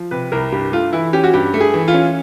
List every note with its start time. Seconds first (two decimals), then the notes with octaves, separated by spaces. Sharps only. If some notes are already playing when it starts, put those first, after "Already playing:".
Already playing: F3
0.11 C3 B4
0.32 C2 A#4
0.52 G2 G4
0.72 A3 F4
0.93 E3 E4
1.13 C#4 G4
1.24 F#4
1.33 G2 G4
1.54 A3
1.60 G#4
1.74 E3
1.88 F4
1.94 C#4